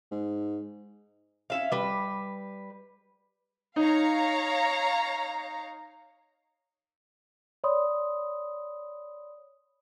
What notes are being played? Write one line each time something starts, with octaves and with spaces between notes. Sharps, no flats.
G#2
C#4 E5 F5
G3 B4
D#4 C#5 F5 A#5
C#5 D5 B5 C6 D#6